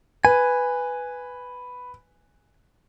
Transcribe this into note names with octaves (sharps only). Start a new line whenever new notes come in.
B4 G#5